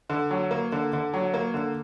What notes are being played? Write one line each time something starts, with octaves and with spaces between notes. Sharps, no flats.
D3
F#3
A#3
D3
D3
F#3
A#3
D3